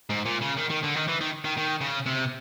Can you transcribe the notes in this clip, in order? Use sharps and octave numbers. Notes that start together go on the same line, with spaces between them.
G#2
A#2
C#3
D#3
D#3
D3
D#3
E3
D#3
D#3
D#3
C#3
C3